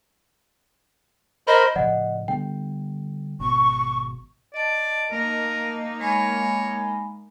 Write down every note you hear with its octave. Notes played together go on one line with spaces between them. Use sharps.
A#4 C5 D#5 B5
A2 C#3 F3 D5 D#5 F#5
D3 G3 B3 G5
G#1 B2 C#6
D5 D#5 A5
A#3 D#4 A#4
G#3 C#5 G#5 B5